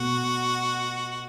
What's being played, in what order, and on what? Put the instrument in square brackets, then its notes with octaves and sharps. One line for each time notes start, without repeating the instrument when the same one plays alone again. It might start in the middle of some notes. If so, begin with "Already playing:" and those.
Already playing: [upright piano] B2 A3 [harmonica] F#4